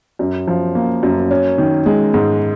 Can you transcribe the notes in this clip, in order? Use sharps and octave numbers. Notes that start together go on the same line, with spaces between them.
F#2
F3
A#3
F#2
C#4
D#3
G#3
G#2